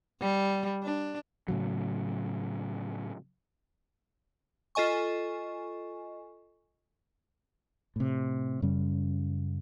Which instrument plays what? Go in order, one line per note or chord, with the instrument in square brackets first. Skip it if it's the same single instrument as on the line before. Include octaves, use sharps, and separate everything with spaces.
[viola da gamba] G3
D4
[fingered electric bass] A2 C#3 F#3
[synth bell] F4 A4 D#5 G#5 C#6
[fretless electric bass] A2 C3
F#2 C#3 G3 C#4